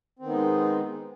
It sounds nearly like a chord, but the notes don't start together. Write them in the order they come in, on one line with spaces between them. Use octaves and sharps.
C4 D#3 B3 D#4 G#3